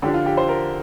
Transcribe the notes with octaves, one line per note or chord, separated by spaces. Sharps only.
D3 F3 D4 G4
F4
G4
C5
A#4